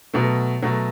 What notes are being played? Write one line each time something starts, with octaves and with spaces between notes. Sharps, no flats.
B2 F#3 A3
B2 F#3 A3